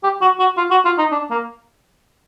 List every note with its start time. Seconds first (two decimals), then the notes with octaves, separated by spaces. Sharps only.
0.03 G4
0.22 F#4
0.39 F#4
0.57 F4
0.71 F#4
0.85 F4
0.98 D#4
1.12 D4
1.31 A#3